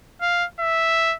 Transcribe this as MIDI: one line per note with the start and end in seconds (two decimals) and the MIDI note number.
0.21 0.45 77
0.60 1.15 76